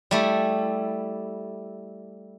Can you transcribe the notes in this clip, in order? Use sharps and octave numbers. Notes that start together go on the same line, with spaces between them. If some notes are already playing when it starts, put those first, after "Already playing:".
G3 A3 E4